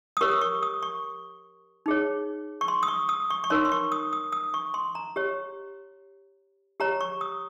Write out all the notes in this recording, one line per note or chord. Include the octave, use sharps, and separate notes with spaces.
D#6
G4 A#4 C#5 C#6
D#6
C#6
D#6
C#6
D#4 G#4 C#5
C#6
C6
D#6
C#6
D#6
C#6
C#6
D#4 A#4 C#5 C6
C6
C#6
D#6
D#6
D#6
C#6
C6
A#5
G4 C#5
G4 C#5 A#5
C#6
D#6